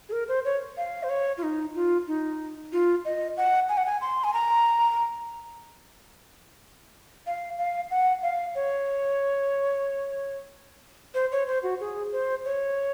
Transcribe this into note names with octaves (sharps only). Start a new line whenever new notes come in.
G#4
A#4
C5
C#5
F5
C5
C#5
F4
D#4
F4
D#4
F4
D#5
F#5
G#5
F#5
G#5
C6
G#5
A#5
F5
F5
F#5
F5
C#5
C5
C#5
C5
F#4
G#4
C5
C#5